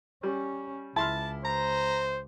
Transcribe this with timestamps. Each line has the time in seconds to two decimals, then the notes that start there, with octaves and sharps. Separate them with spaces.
0.23 G3 C#4
0.96 C#2 E4 A5 C6 F6
1.45 C5 A#5